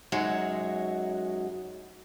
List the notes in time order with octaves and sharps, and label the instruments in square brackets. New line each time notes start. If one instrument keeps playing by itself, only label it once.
[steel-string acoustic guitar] F#2 F#3 G#3 D#4 F#4 C#5